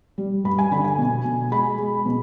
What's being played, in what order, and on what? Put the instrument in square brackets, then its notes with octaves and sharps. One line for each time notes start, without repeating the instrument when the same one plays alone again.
[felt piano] G3
G2 B5
G#5
D3 B5
G#5
B2
B2
G#3 B5
G#3
B2